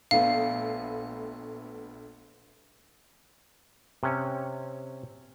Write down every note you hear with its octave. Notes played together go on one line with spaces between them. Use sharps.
A#1 A3 B3 F5
C3 C#4